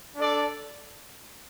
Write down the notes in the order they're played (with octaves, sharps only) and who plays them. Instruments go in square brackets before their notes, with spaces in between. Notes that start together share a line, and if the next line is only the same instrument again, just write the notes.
[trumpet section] D4 A4 D5